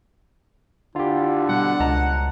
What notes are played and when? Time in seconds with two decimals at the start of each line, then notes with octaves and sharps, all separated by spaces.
0.96 D3 E4 F4 G4
1.49 B2 G3 F#5
1.80 C#2 D#5 A5 A#5